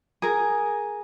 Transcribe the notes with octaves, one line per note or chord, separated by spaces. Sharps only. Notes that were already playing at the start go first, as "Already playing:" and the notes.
G#4 A#4